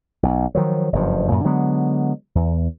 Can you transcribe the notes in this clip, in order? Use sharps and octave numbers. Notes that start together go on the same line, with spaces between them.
B1
D#3 F3 F#3
F#1 G2 F3
F#2 A#2
D3 F#3 G#3 B3
E2